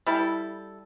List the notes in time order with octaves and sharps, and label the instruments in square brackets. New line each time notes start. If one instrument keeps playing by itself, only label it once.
[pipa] G3 E4 A4